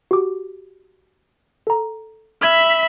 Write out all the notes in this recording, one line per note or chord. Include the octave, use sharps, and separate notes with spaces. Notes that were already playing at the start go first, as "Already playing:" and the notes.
F#4 G4 D6
A4 A#5
E5 B5 F6 G#6